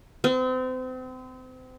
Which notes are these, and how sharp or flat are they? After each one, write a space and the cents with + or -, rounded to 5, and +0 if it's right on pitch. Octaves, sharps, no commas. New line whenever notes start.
C4 -35